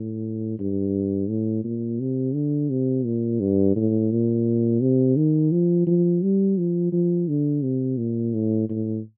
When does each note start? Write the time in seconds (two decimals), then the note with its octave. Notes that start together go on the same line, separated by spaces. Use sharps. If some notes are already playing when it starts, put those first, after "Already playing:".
Already playing: A2
0.59 G2
1.29 A2
1.64 A#2
2.00 C3
2.34 D3
2.70 C3
3.05 A#2
3.40 G2
3.76 A2
4.11 A#2
4.81 C3
5.16 D#3
5.52 F3
5.87 F3
6.22 G3
6.58 F3
6.92 F3
7.28 D3
7.63 C3
7.98 A#2
8.34 A2
8.69 A2